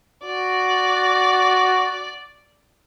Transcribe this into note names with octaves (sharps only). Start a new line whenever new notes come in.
F#4 D5